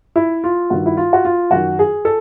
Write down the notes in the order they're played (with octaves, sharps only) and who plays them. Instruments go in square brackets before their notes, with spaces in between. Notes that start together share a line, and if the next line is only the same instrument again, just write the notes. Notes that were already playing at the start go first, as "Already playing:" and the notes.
[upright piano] E4
F4
G2 D#3 F#4
E4
F4
F#4
F4
F#2 D#3 F#4
G#4
A4